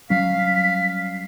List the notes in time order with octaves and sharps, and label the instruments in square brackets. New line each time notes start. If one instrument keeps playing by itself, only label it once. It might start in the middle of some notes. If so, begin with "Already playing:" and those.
[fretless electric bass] F#3 G3 C#4 [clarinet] F5 [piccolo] B6